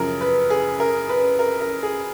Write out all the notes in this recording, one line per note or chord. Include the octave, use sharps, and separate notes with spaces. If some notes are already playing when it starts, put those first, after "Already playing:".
Already playing: F#2 C#3 F3 A#4
B4
G#4
A#4
B4
A#4
A#4
G#4